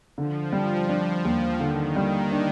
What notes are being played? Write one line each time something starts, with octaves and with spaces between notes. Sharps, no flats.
D3 F3
G3
D4
D#2
D3 D#3
D#3 G3
D4